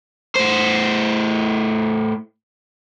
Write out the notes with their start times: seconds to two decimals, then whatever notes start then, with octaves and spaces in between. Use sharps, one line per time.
0.36 A2 C5